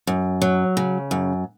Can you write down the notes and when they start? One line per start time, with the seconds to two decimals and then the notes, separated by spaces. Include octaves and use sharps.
0.07 F#2
0.42 F#3
0.77 C#3
1.11 F#2